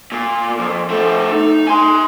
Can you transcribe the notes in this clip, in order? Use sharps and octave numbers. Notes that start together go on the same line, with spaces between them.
A#2
F2
A3 C4
D#4
G#5 C6